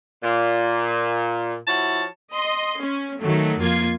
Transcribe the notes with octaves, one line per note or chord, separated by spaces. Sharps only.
A#2
F3 E4 F#4 C#5 A5
D#5 C6
C#4
D#3 F#3 A3
F2 A#3 F4 G#6 C7